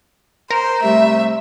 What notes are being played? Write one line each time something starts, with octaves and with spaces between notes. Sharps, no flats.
A#4 C5
C3 G3 A3 E5